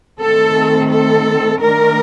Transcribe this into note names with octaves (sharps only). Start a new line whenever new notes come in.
D#3 A3 C4 A4
A4
D#3 A3 D4 A#4